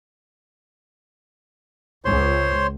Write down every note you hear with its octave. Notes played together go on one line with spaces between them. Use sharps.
C#2 C5 C#5 C6